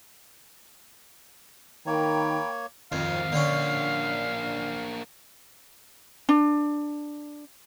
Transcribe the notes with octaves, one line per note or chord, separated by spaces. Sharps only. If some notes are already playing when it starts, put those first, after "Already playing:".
D#3 A#3 C#5 G5 A#5 B5
F2 D#3 C4 F5
D3 A#3 C#4 D4
D4